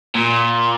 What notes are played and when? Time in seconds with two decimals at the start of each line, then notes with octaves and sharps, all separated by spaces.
0.15 A#2